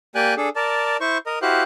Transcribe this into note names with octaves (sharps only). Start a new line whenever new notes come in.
A#3 G4 D5 G5 G#5 F#6
D4 G#4 A4
A#4 D5 A5
E4 C5 C#6
A#4 D#5
E4 F#4 G4 C5 F5 F#6